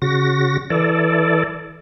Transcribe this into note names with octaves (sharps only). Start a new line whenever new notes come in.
C#3 F#4 A#6
E3 A4 D5